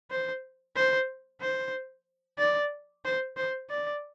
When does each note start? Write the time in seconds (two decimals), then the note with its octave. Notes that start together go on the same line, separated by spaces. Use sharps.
0.10 C5
0.76 C5
1.41 C5
2.39 D5
3.05 C5
3.37 C5
3.70 D5